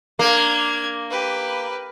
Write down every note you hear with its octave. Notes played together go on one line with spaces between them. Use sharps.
A#3 D4 G#6
G4 B4